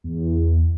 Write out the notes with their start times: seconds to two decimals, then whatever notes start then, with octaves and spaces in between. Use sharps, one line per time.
0.04 E2